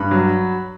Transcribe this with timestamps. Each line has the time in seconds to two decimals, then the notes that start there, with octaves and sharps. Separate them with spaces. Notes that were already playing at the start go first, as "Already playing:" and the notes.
Already playing: G2 B5
0.11 F#3